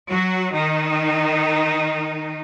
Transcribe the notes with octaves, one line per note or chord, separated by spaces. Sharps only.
F#3 F#4
D#3 D#4